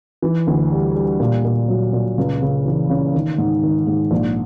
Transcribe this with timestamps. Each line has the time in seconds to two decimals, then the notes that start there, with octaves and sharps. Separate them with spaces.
0.22 E3
0.47 D2
0.72 G3
0.96 G3
1.20 A#2
1.45 A#2
1.68 F#3
1.93 A#2
2.18 C#2
2.42 C#3
2.66 E3
2.90 C#3
3.14 D#3
3.38 G#2
3.63 D#3
3.87 G#2
4.11 A#1